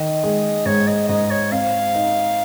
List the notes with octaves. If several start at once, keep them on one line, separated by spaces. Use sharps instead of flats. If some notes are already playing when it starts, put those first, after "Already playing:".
Already playing: D#3 D#5
G#3
G#2 C#5
D#5
G#2 D#5
C#5
C4 F5
D#4